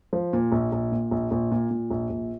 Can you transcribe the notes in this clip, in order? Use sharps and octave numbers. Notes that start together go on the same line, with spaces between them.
F3
A#2
A#1
A#1
A#2
A#1
A#1
A#2
A#2
A#1
A#1